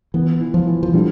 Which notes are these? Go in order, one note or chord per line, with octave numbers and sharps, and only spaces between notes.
E3 B3
E3
F3
E3
F3
D3 G3